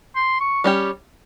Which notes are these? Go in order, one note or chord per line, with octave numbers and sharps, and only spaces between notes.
C6
C#6
G3 C#4 G4